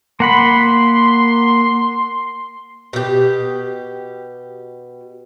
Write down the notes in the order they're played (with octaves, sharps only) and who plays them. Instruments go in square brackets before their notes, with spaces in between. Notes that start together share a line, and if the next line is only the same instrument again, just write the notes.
[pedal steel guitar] A#3 F#5 B5 [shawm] C6
[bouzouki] B2 G4